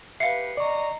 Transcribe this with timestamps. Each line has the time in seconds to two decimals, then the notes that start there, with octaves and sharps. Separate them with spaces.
0.20 G4 B4 E5 F5 C7 C#7
0.57 D5 D#5 A#5 C#6